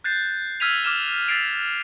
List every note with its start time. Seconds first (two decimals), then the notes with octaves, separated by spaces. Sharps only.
0.04 F#6 G6 A6 C7
0.60 E6 F6 G#6 B6 D#7 F7
0.83 D6 F6 E7 G7
1.28 E6 A6 B6 C7 D7 F7